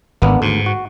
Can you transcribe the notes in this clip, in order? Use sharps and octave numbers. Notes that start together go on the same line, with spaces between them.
G#1 A#3 B3 D4
D2 G#2
F#4